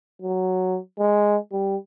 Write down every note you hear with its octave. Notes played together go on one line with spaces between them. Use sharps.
F#3
G#3
G3